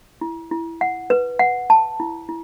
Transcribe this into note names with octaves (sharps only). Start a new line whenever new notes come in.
E4
E4
F#5
B4
F#5
A5
E4
E4